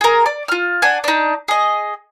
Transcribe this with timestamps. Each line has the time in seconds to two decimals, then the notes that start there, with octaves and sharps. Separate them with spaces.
0.01 G#4 A#4
0.26 D5
0.48 F4 F6
0.82 D4 F#5 G#5
1.04 D4 D#4
1.48 G#4 D#5